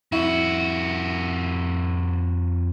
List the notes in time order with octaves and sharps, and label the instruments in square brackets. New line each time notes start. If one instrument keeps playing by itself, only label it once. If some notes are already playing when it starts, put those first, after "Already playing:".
[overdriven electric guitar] F2 F#4 [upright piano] E4